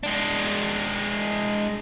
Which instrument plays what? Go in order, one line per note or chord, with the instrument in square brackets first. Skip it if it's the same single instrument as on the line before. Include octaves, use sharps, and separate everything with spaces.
[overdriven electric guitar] G#3 D4